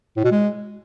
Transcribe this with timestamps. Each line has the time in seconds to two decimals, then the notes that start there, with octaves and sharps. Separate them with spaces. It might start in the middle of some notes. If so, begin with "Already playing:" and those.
0.17 A2
0.24 B2
0.31 G#3